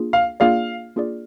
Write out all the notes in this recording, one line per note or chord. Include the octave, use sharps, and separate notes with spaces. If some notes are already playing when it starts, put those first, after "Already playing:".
Already playing: A#3 D4 F4 G#4
F5
A#3 D4 F4 G#4 D5 F5
A#3 D4 F4 G#4 D5